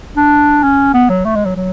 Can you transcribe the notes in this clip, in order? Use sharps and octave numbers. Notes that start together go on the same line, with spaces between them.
D4
C#4
B3
F#3
A3
G#3
F#3
F#3